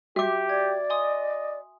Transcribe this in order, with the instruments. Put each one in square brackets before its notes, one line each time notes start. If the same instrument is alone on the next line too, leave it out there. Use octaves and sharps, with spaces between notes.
[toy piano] F#4 D6 [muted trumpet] G4 [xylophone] E5
[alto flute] D5 [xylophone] G#6
[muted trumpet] D#5 [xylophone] G#5 C6 D#6